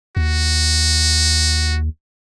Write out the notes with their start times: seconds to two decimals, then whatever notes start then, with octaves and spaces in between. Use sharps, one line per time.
0.17 D#2 F#4